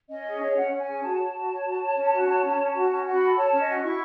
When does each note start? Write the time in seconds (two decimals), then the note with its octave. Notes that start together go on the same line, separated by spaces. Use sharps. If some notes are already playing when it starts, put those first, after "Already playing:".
0.09 C#4 D#5
0.25 G#4
0.41 C#5
0.56 C#4 F#5
0.71 C#4
0.79 G#5
0.87 G#4
1.02 F#4 A5
1.18 C#5
1.34 F#4
1.49 C#5
1.65 F#4
1.81 C#5
1.96 C#4
2.11 F#4
2.27 C#5
2.43 C#4
2.58 C#4
2.74 F#4
2.90 C#4
3.05 F#4
3.13 B5
3.20 A4
3.36 C#5 A5
3.51 C#4
3.59 D#5
3.67 F#4
3.82 E4 C#6